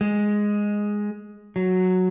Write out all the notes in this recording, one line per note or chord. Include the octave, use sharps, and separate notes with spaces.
G#3
F#3